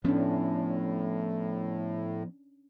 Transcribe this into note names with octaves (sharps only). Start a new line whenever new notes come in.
A2 F3 B3 C#4 D4